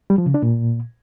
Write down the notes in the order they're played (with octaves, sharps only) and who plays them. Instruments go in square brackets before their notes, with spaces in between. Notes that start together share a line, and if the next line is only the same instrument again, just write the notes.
[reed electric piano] G3
F3
C#3
D4
A#2